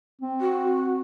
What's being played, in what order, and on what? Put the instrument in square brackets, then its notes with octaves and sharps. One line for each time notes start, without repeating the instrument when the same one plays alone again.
[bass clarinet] C4
[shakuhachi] F#4